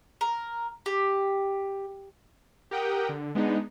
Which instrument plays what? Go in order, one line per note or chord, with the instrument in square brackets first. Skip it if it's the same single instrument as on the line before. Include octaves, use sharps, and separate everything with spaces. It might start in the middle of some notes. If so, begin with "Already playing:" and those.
[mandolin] A#4
G4
[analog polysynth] G4 A#4 F#5 G5 D#6
D3
G#3 B3 D4 D#4